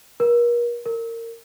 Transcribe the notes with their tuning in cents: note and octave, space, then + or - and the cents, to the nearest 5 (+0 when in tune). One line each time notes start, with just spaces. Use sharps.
A#4 +40
A#4 -25